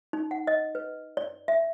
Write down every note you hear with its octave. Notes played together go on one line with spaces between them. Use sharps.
D#4
F#5
D#5
B4
D5
E5